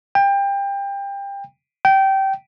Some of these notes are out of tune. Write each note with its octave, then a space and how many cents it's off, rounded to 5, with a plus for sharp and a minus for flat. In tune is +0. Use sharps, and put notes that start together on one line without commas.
G5 +25
G5 -20